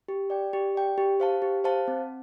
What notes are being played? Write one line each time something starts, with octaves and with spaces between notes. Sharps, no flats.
G4
D5 G5
G4
D5 G5
G4
C5 F5 A5
G4
C5 F5 A5
C4